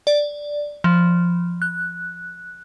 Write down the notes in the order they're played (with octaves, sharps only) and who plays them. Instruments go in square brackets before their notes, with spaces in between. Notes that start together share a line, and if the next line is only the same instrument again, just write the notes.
[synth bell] D5
F3
F#6